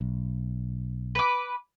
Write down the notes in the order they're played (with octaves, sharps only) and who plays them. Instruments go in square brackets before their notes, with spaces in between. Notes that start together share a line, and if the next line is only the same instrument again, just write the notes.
[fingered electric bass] B1
[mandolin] B4 D6